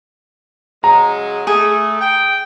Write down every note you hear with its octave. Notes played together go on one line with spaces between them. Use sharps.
C#3 F#3 G#3 A#5
A3 G#4
G5